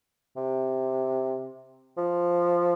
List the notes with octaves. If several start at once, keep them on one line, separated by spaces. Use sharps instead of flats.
C3
F3